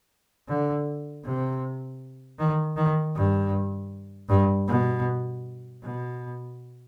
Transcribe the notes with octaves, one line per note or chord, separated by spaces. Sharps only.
D3
C3
D#3
D#3
G2
G2
B2
B2